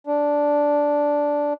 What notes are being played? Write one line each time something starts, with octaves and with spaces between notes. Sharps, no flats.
D4